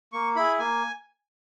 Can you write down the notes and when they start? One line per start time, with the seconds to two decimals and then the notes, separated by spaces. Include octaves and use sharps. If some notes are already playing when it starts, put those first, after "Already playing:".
0.12 A#3 C#6
0.36 E4 G#4 B5
0.59 A#3 G#5